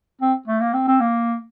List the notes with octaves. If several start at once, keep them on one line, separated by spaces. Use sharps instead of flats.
C4
A3
A#3
C4
C4
A#3